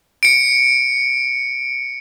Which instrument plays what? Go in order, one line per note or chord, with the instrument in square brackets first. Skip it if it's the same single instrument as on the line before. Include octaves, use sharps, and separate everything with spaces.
[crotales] C#7 D7